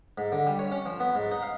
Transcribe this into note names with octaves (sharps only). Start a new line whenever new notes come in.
G#2
D3
G3
C#5
C#4
F3
B3
G#2
D#4
F5